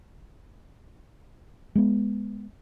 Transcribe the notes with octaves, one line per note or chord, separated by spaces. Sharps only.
G#3 B3